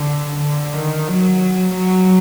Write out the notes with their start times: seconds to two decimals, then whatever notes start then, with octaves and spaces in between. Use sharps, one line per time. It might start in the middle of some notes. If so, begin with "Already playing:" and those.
Already playing: D3
0.40 D3
0.73 D#3
1.07 F#3
1.75 F#3